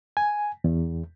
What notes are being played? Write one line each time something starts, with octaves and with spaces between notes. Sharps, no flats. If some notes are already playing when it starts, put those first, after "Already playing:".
G#5
E2